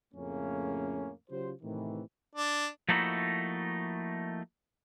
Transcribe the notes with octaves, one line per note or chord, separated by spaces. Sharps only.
F2 A2 C#3 A3 A#3 C#4
C#3 F#3 F4 G4 C5
A2 C3 D#3 E3
D4
F3 A3 A#3 D#4 E4 F#4